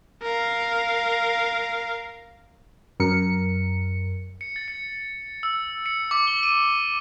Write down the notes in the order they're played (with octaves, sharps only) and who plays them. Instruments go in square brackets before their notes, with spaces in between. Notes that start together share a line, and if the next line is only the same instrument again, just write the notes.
[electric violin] A#4 F5
[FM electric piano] F#2 A#4 C#7
[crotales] C#7
A6
C#7
E6
C#7
D6
G7
D#7